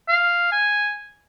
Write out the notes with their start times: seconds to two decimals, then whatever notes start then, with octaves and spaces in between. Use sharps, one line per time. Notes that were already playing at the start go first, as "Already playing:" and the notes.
0.09 F5
0.52 G#5